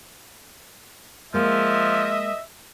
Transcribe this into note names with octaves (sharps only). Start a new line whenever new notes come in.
F3 G#3 A#3 D#5 E5